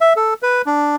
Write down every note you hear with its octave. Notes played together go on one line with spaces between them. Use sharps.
E5
A4
B4
D4